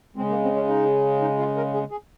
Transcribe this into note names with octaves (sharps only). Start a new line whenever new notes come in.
C#3 G#3 C4
A#3
C4
C#4
D#4
D#4
F4
A#4
G#4
G#4